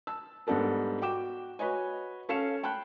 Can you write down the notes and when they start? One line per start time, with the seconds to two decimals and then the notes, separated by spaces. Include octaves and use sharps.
0.07 A5 E6
0.47 G#2 G3 B3 D4 A4 A#4
1.02 F#4 G5 D6 E7
1.59 F#4 B4 C#5 D#5 G#5
2.29 C#4 A4 F5 C7 C#7 E7
2.63 G5 A5 B5 F#6